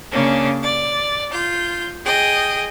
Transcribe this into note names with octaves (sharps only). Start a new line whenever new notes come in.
C#3 A#3 C#4 D4
D5
F4 G6
G#4 D#5 G5